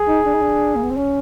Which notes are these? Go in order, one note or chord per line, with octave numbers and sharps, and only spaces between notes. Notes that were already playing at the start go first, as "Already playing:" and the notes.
Already playing: G#4
D#4
D4
D#4
D4
A#3
B3
C4
C#4